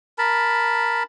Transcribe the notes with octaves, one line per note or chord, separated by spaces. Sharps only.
A#4 A5 B5